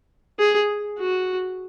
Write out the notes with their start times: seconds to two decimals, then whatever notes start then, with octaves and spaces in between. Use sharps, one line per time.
0.39 G#4
0.99 F#4